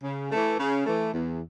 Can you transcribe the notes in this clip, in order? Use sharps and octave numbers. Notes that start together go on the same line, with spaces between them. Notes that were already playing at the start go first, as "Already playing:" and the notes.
C#3
E3 A3
C#3
E3 A3
E2